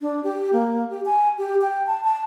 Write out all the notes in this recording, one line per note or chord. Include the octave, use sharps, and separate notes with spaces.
D4
G4
A#3
G4
G#5
G4
G5
A5
A5